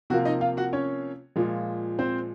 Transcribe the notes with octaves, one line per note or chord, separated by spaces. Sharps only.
C3 F3 A#3 F#4
D#4 D#5
F4 F5
F#4 F#5
C#4 C#5
A#2 F3 G#3
C4 C5